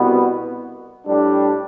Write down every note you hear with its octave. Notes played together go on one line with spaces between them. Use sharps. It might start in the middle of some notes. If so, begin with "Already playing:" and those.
Already playing: C2 B2 B3
A2 G3 D4